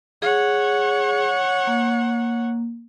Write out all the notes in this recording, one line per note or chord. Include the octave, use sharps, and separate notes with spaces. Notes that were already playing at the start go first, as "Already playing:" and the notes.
G#4 C#5 F#5
A#3